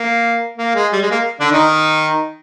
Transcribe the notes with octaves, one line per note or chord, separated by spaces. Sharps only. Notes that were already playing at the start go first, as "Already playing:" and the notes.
Already playing: A#3
A#3
G#3
G3
G#3
A#3
D3 D4
D#3 D#4